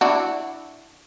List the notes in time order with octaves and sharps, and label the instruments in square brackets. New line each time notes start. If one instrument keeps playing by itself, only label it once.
[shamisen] D4 E4 F#4